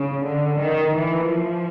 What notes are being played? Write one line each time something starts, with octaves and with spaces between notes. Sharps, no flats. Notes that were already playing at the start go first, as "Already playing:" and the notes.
Already playing: C#3
D3
D#3
E3
F3